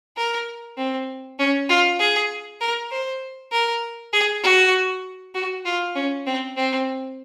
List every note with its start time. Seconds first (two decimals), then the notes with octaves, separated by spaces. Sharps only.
0.17 A#4
0.77 C4
1.39 C#4
1.69 F4
1.99 G#4
2.61 A#4
2.91 C5
3.52 A#4
4.13 G#4
4.43 F#4
5.35 F#4
5.65 F4
5.95 C#4
6.26 C4
6.56 C4